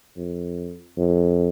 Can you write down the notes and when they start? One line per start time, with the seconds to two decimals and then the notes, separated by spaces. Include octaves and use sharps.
0.17 F2
0.97 F2